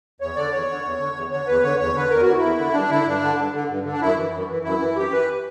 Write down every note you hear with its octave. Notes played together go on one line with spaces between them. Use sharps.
E2 C#5
D3 D5
E2 C#5
D3
E2
D3
E2
D3 C#5
E2 B4
D3 C#5
E2 C#5
D3 B4
E2 A#4
F#4
D3 E4
E2
D3
G2 D4
D3 E4
G2 D4
D3
G2
D3
G2
D3
D4
F#2 E4
E3
F#2
E3
F#2 E4
E3
F#2 G4
E3 B4